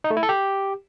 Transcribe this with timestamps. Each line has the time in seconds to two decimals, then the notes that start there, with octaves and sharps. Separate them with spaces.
0.04 D#4
0.11 A3
0.17 E4
0.23 A4
0.29 G4